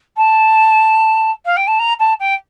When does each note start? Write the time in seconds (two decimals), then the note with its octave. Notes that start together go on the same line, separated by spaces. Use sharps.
0.17 A5
1.45 F5
1.57 G5
1.67 A5
1.79 A#5
2.00 A5
2.20 G5